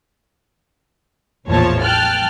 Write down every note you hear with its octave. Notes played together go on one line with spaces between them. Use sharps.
A1 E2 A#2 F3 C#5 A5
G5 A5 F6 F#6